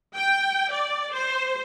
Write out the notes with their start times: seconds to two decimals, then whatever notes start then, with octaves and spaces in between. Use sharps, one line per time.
0.15 G5
0.71 D5
1.14 C5